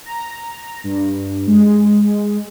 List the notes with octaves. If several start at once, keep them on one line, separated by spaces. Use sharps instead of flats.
A#5
G2
G#3